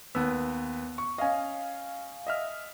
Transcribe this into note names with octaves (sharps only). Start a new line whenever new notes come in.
D#2 B3 E6
C#6
C#4 D#5 F5 G#5
D#5 E5 F6